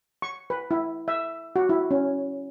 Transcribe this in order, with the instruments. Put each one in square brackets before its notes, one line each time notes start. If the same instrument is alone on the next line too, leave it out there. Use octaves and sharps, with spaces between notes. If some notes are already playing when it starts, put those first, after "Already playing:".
[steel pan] C#6
B4
E4
E5
F#4
E4
C#4